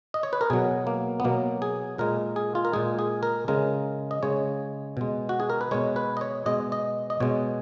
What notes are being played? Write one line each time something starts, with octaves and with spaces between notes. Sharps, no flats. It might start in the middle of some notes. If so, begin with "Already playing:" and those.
D#5
C#5
B4
A#4
B2 F#3 G#4
A#3
B3
B2 F#3 A#3
G#4
A#2 G#3 A#4
G#4
F4
A#4
A#2 G#3 G#4
G#4
A#4
C#3 G#3 A#4
D#5
C#3 G#3 C#5
B2 G#3
F#4
G#4
A#4
B4
B2 G#3 C#5
B4
D#5
C#5
B2 G#3 D#5
D#5
D#5
B2 G#3 C#5